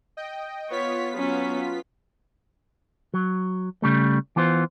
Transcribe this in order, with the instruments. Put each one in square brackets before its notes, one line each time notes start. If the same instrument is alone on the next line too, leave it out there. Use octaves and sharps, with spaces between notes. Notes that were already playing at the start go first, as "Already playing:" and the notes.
[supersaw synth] D#5 G5
[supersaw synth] B3 F4 B6 [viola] C#5
[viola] F#3 C#4
[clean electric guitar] F#3
C#3 G3 A3
E3 B3 F4 C5